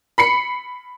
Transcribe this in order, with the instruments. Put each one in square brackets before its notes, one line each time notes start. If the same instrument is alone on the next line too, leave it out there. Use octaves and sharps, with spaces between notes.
[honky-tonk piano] B5 C7 C#7